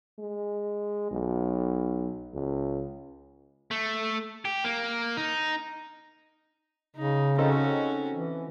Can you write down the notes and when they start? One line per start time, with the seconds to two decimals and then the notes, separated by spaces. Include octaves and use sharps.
0.19 G#3
1.11 B1
2.33 C#2
3.71 A3
4.45 G4
4.64 A#3
5.17 D#4
6.96 C#3 D#4
7.38 C4 C#4 D#4 F#4 A4
8.12 E3